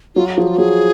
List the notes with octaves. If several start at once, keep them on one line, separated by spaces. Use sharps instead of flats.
F#3 F4
F#4
F3 G#4
F4
F#3 G#4